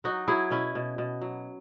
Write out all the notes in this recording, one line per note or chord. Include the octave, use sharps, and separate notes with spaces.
F#3 D#4 F#4
F#3 E4 G#4
B2 C#4 E4
B2
B2
F#3